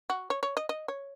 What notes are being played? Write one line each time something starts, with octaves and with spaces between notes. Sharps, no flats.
F#4
C#5
C#5
D#5
D#5
C#5